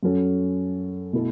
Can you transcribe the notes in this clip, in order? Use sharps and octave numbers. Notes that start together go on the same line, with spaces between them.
F#2 F#3 C#4 A4
B2 A3 E4 A4